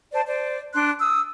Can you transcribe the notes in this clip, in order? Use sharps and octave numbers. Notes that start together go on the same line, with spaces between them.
C5 D5 A5
C5 D5
D4 C6 F#6
D#6 E6